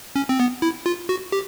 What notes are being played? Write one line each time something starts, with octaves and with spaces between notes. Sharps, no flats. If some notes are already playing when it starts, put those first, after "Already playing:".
C#4
C4
B3
E4
F4
F#4
G4